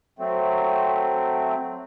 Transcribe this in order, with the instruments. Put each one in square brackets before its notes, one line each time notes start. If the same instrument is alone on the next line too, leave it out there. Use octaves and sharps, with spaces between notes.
[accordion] F#3 A3 C4